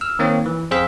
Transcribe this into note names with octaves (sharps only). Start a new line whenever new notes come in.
E6 F6
D#3 A#3 C4 C#5
E3
F2 G#4 C5 F5 E6 B6